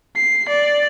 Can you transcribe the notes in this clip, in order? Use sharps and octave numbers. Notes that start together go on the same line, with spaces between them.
C7
D5